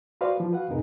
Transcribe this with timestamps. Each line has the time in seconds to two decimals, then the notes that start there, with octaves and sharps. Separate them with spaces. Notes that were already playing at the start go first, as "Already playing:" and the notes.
0.21 F#4 B4 C5 D5 F5
0.40 F3 F4
0.52 F#4 B4 F5 F#5
0.68 F2 A2 C3 D#4 G#4 A#4